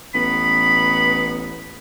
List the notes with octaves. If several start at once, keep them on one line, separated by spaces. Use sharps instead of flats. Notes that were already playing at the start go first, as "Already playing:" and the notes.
A1 B3 B5